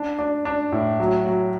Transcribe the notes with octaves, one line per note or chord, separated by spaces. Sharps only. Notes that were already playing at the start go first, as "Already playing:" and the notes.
Already playing: D4
D4
D4
A2
F#3
F#3